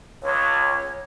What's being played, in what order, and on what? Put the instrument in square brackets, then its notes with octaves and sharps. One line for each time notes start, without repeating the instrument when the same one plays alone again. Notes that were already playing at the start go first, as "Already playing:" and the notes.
[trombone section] C#2 [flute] C#5